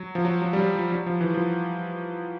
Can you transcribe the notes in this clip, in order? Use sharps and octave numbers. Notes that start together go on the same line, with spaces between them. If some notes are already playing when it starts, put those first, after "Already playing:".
Already playing: F#3
F3
F#3
F#3
G3
F#3
F3
F#3
F3
E3
F3